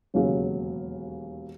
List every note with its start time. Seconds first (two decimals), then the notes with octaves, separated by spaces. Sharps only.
0.14 E1 D#2 C#3 F#3